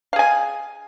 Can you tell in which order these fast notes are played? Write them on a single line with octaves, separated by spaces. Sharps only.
F5 G#4 G#5